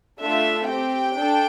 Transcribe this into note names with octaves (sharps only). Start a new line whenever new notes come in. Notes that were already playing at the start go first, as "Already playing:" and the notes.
A3 D4 F4 E5
C4 G4 G5
D4 A4